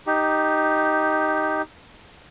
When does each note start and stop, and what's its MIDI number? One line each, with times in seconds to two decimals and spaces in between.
0.07 1.62 63
0.07 1.62 67